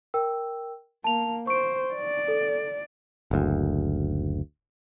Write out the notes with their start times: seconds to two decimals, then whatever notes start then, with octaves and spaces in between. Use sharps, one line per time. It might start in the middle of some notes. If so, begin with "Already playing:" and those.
0.14 A#4 G5 E6
1.04 A#3 A5 F7
1.47 C5 C#6 D7
1.94 D5
2.28 A4
3.31 F#1 D2